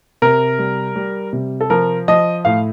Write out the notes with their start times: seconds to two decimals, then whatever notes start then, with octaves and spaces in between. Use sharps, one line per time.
0.22 C3 A#4
0.59 G3
0.96 G3
1.33 C3
1.61 A4
1.70 F3 A#4
2.08 F3 D#5
2.45 A2 F5